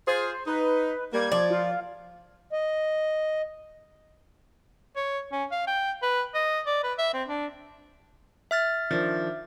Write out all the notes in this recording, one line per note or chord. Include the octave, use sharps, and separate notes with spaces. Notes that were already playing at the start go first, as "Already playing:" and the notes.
F4 G#4 C5
D#4 B4
G3 A#3 G#6
F3 D5
F4
D#5
C#5
C#4
F5
G5
B4
D#5
D5
B4
E5
C4
D4
E5 F6 A6
D#3 F3 D4